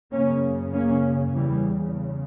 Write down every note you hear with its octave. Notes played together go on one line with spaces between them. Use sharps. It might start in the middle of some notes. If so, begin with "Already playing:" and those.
F#2 C#3 A#3 C#4
A#3 C#4
E2 C#3 E3 G3